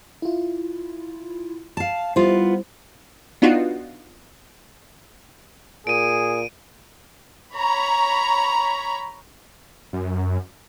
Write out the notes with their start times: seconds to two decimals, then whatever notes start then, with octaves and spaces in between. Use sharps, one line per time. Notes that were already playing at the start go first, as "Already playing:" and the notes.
0.22 E4 F4
1.77 F5 A5
2.16 G3 B3 E4 F4 C5
3.42 B3 D4 D#4 F4 F#4
5.87 A#2 G#4 D7 D#7
7.56 C#5 A#5 B5
9.93 F#2